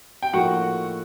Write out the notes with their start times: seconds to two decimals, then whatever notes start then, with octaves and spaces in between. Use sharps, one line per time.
0.22 G5
0.33 A2 F3 A#3 D#4 F#4 F#5